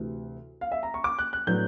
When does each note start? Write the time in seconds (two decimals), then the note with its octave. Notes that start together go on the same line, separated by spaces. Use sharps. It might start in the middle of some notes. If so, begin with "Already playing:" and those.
Already playing: D2 C3 E3
0.61 F5
0.72 E5
0.83 A#5
0.94 C#6
1.04 D6
1.19 F#6
1.33 F#6
1.47 A2 F#3 B3 D4 G6